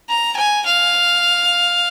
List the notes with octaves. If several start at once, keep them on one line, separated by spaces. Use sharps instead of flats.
A#5
G#5
F5